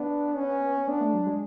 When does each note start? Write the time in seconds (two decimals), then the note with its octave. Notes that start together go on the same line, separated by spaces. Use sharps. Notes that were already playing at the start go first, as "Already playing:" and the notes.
Already playing: B3 D4
0.35 C#4
0.87 B3 D4
1.00 A3
1.14 F#3
1.26 G#3